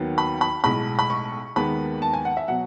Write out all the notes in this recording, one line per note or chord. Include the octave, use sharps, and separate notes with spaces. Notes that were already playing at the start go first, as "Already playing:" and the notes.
Already playing: D#2 D#3 F#3 B3
B5
B5
B1 A2 G#3 B5
B5
C#6
D#2 D#3 G#3 B3 B5
A5
G#5
F#5
E5
B2 F#3 F#5